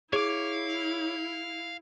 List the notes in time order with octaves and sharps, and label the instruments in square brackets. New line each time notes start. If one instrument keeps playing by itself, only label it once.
[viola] E4 [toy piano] G#4 [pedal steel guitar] C#5 D6 [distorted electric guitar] F5